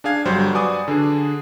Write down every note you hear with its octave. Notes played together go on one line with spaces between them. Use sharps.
D4 G#4 F5 G#6
G1 F#3 G3 C5
F#4 B4 D5 G#5 D6 D#6
D3 D4 G#4